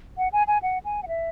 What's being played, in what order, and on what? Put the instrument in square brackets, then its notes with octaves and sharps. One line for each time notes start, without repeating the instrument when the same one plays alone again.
[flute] F#5
G#5
G#5
F#5
G#5
F#5
E5